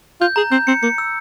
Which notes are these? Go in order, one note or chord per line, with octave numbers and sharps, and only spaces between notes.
F4 G6
G#4 A#5
C4 G6
C4 C#7
A#3 C#7
E6